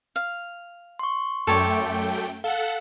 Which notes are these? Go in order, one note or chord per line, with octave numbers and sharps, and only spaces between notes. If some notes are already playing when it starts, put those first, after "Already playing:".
F5
C6 C#6
F#2 A3 A4 C#5 D5 G5
A4 F5 F#5